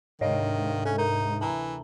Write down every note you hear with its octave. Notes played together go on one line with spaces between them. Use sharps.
D2 G#2 C3 D#3 C#5 D#5 F5
C#4 A4
D#4 A#4
E3 A5 A#5